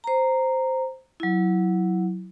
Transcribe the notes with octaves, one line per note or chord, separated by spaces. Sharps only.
C5 A#5
F#3 E4